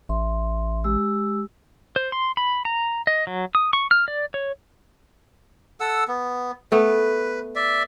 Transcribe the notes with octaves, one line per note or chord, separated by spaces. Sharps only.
A1 E5 C6
G#3 G4 E6
C5
C6
B5
A#5
D#5
F#3
D#6
C#6
F6
D5
C#5
A4 F#5 E6
B3
A3 B3 B4
D5 E5